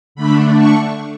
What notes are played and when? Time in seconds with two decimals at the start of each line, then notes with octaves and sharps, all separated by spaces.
0.15 D3 A3 D4 B5
0.57 C#6